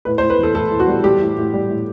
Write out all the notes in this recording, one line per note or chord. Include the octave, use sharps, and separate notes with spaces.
A2 B4
C5
A2
B4
E3 A4
A2 A4
E3
F#4
G3
G3 G4
A2
A2
G3
A2